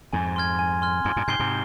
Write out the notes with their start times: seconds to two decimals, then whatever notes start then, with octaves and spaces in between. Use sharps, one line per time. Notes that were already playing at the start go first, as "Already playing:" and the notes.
0.13 F2 G#2 G#5
0.36 C6 F6 G#6
0.59 G#5
0.82 C6 F6 G#6
1.04 F2 G#2 C6
1.16 G2 A#2
1.28 G#2 C3 G6 C7 G7
1.39 G#2 C3